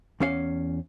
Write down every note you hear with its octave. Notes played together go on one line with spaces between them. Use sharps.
E2 C#4 F5